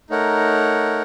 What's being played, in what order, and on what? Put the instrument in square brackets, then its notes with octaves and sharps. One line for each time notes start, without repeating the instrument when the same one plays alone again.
[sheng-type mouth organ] A3 D#4 A#4 C#5 F#5